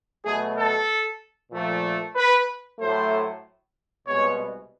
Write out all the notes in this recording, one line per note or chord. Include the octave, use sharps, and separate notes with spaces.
B2 F#3 A3 G#4
A4
A#2 F3 A3
B4
A2 F#3 A3 C5
C2 B2 G#3 B3 C#5